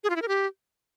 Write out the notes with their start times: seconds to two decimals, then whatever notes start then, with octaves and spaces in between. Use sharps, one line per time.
0.04 G#4
0.10 F4
0.16 E4
0.22 A#4
0.28 G4